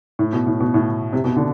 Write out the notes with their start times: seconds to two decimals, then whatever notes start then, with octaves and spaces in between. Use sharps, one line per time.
0.19 A2
0.33 B2
0.47 A2
0.60 B2
0.74 A2
1.13 C3
1.24 B2
1.36 D3